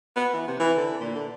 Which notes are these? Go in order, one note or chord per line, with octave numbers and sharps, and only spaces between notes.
B3
E3
C3
E3
D3
A#2
D3